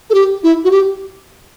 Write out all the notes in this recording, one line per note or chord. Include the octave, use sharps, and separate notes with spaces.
A4
G4
E4
F#4
G4